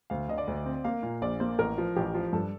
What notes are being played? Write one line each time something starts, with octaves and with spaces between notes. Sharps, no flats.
D2 F5
D3 D#5
D5
D2
C4
A#3 F5
A#2
A#1 D5
A#3 C5
A1 A#4
F3
A1 G4
F3
G2 A4